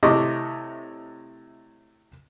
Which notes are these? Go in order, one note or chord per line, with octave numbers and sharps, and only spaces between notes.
A2 C3 D#5 C#6 D6